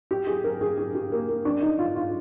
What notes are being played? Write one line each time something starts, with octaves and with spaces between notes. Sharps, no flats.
G4
G#4
A#4
G#4
G#4
G4
A#3
A#3
D4
D#4
F4
F4